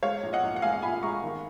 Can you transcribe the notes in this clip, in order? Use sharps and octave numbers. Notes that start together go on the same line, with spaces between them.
G#3 C#5 F5
A#1
D#5 F#5
A#1
F#5
G#3 F5 G#5
A#2 G#5 B5
G#3 A#5 C#6
D#3